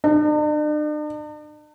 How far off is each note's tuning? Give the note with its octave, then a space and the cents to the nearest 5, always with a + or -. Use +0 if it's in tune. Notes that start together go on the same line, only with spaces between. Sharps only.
D4 +45